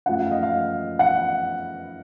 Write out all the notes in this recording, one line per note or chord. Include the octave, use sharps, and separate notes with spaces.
F#2 F3 A3 F#5
F5
D#5
F5
F#5